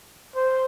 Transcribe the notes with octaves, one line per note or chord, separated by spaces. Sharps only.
C5